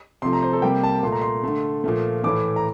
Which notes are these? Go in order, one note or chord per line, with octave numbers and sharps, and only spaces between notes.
C3 F3 A3 C6
A#5
C5
A4
C3 G3 A#3 G5
A5
A#2 A3 C6
A#5
C6
D3 A3
A#2 F3 A3
A2 E3 A3 D6
A#5